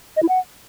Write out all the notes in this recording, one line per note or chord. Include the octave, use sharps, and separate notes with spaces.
D#5
E4
F#5